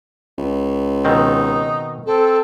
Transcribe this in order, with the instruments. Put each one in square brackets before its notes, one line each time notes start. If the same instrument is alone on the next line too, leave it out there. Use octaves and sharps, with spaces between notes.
[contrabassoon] C#2
[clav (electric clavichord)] B2 D#3 C4 [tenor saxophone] D#4
[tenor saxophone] C4 [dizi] A4